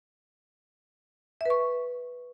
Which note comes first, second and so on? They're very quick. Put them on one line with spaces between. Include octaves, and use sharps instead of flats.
E5 B4 C#6